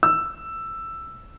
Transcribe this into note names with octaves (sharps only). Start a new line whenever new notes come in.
E6